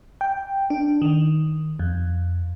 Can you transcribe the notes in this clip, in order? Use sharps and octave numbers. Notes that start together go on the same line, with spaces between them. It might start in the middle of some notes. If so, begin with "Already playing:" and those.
G5
D4
D#3
F2